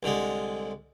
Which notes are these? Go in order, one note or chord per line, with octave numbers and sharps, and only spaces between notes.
C2 D3 G#3